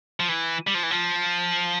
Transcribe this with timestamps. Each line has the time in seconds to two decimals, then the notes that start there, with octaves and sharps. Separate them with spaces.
0.20 F3
0.29 E3
0.67 G3
0.75 F3
0.83 E3
0.91 F3